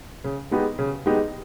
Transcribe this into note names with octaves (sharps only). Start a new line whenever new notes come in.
C#3
G#3 B3 D#4 G4
C#3
G#3 B3 D#4 G4